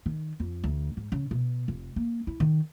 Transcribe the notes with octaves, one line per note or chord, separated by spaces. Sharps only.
D#3
F2
D2
G#2
C#3
B2
F1
A#3
E4
D#3